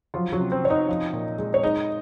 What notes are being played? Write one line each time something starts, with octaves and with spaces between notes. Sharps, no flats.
F3 F#3 F4
F#3 F#4
C3
C4 C5
C3 C#5
D#4 D#5
F3
A#2
G#3
C#5
G#3 D#4 D#5